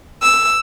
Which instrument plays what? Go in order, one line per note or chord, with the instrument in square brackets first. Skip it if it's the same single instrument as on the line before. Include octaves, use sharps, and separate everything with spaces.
[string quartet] E6